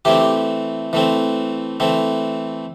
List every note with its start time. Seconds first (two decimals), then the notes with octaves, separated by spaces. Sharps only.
0.05 E3 A3 C4 G4
0.93 E3 A3 C4
1.80 E3 A3 C4